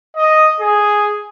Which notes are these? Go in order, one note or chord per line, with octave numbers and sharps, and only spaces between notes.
D#5
G#4